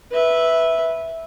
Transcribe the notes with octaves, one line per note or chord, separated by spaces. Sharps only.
B4 E5